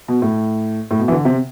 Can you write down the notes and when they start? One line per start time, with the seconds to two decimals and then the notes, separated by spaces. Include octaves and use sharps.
0.08 B2
0.22 A2
0.91 A2
0.99 B2
1.08 E3
1.12 D3
1.25 C3